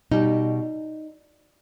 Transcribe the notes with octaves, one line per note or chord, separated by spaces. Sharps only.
B2 G3 D#4